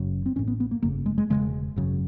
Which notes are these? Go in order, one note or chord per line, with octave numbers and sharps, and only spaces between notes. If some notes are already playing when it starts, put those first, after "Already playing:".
Already playing: F#1 F#2 C#3
C4
A1 A2 C#4
B3
B3
A#3
G1 F2 C#3 A#3
G#3
G#3
E1 E2 C#3 G#3
G#1 F#2 C#3